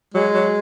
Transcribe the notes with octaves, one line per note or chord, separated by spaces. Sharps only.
F#3 G#3
F#3